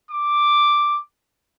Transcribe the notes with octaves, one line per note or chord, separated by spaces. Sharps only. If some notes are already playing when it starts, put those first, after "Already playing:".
D6